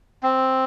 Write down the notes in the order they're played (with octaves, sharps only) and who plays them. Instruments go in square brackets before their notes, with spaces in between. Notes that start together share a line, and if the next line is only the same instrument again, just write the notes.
[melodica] C4